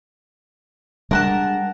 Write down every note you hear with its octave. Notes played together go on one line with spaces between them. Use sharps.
G3 G#3 D4 A#4 F#5 A5